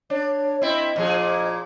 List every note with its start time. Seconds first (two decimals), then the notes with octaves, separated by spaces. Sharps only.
0.10 D4 C#5
0.62 C4 E4 D#5
0.96 A#2 F3 G#4